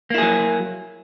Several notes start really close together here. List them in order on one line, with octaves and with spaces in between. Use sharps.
A#3 E4 G#4 F#3